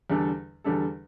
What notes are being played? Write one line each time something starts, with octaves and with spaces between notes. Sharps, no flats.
E2 D3 G3 D4 A4
E2 D3 G3 D4 A4